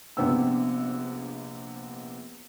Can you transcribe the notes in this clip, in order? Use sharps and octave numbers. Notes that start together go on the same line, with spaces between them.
A#1 C3 B3 D4 G5 E6